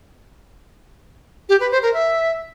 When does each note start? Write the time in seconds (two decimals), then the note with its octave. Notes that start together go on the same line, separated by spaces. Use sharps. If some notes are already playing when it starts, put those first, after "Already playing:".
1.49 G4
1.60 B4
1.71 C5
1.82 A#4
1.94 E5